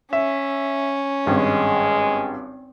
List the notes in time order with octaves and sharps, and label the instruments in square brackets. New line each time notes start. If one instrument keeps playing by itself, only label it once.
[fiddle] C#4 [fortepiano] E5
[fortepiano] G#1 G2 [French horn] G#3